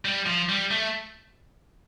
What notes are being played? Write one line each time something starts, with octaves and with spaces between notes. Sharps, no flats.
G3
F3
G3
A3